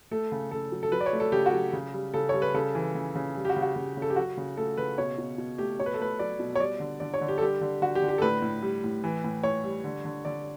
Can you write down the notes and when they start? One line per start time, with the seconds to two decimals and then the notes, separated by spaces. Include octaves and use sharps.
0.11 A3 A4
0.32 C#3
0.51 C#3 A4
0.72 F#3
0.83 A4
0.92 F#3 B4
1.01 D5
1.06 C#5
1.13 A3
1.20 A4
1.32 C#3 G4
1.46 F#4
1.52 F#3
1.73 C#3
1.94 G3
2.14 C#3 A4
2.29 G3 C#5
2.42 B4
2.54 C#3 A4
2.75 E3
2.95 C#3
3.15 C#3
3.36 G3
3.45 G4
3.49 F#4
3.56 C#3
3.62 F#4
3.76 C#3
3.97 C#3
4.02 A4
4.10 G4
4.16 F#3 F#4
4.37 C#3
4.57 A3 A4
4.78 C#3 B4
4.98 B2 C#5
5.18 B2
5.38 B2
5.58 A3 G4
5.80 B2 C#5
5.86 B4
5.94 A4
6.00 A3 B4
6.19 F#3 D5
6.40 B2
6.55 C#5
6.60 G3 D5
6.80 D3
7.00 D3 D5
7.14 C#5
7.21 D3
7.28 G4
7.38 A4
7.41 G3 G4
7.61 D3
7.82 D3 F#4
7.95 G4
8.02 D3
8.08 G4
8.18 A4
8.22 A2 B4
8.42 A2
8.62 G3
8.84 A2
9.04 E3
9.24 A2
9.43 A2 C#5
9.64 G3
9.84 D3
10.05 D3
10.25 D3 D5